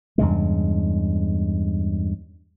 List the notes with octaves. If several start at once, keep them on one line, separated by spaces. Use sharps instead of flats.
E2 G2 C#3 G#3